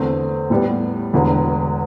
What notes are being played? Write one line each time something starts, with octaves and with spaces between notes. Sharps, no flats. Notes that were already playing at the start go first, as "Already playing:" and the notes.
Already playing: E2 D3 A3 C4
A2 G3 B3
E1 E2 D3